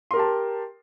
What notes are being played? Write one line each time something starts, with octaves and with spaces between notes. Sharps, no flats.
G4 A#4 A5 C6